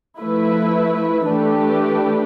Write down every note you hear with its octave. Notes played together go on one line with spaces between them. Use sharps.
F3 A3 E4 B4
E3 A3 D4 G4 B4